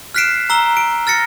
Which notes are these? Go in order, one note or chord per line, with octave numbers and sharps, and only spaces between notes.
F6 F#6 B6 C7 D7 E7
A#5 E6 G7
D7
F6 A6 A#6 C#7